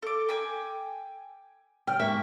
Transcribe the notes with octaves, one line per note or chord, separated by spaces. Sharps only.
A4 D6
G5 G#5 D6
C#3 G5 F6
G#2 A#3 E5 C#6